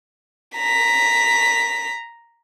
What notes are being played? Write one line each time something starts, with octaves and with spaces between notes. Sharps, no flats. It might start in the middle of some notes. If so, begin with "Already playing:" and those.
A#5 B6